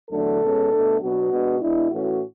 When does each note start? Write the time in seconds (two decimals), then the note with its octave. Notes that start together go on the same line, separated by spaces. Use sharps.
0.10 E2 D3 F#3 A3 D4 A4
0.41 B2 G#3 C#4
0.71 B2 A3 D4
1.00 B2 F#3 B3 D4 F#4
1.30 B2 G#3 B3 D4
1.60 B2 G#3 D4 E4
1.91 A2 E3 A3 C#4 F#4